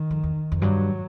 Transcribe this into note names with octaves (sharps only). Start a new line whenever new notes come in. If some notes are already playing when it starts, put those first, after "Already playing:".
Already playing: D#3
F2
E2
F2
G2 F#3